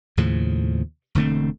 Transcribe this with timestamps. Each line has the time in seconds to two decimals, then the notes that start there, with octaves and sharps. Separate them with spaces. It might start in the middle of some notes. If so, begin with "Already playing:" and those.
0.17 D#2 A2 C#3 F3
1.15 E1 D3 A3 C4